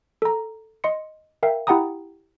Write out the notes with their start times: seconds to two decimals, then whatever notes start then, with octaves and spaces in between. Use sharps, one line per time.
0.22 A4 A#5
0.84 D#5 C6 C#7
1.43 A#4 E5 F5 G5
1.67 E4 G4 F#5 G5 A#5 D#6